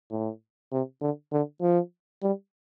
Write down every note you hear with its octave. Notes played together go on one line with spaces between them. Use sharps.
A2
C3
D3
D3
F3
G3